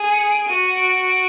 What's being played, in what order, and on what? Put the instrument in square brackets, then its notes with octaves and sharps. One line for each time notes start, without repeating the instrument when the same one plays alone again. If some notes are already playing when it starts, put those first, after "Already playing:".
Already playing: [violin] G#4
[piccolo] C#7
D7
[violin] F#4 [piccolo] D#7
[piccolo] D7